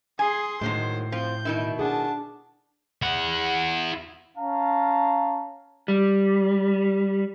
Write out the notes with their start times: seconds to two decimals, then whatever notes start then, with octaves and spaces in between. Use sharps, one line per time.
0.19 G#4 G#5 C6
0.61 A2 D#3 F#3 G#3 C5
1.12 F3 C4 G6
1.45 B2 D#3 E4
1.79 D4 G#4 F#5 A5
3.02 E4 F#5
4.37 C#4 F5 A5 A#5
5.88 G3